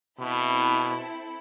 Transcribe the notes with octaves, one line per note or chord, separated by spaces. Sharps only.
B2 C4 E4 A4